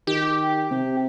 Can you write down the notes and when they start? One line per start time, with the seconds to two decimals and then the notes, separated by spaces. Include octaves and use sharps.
0.07 D#3 G4
0.71 C3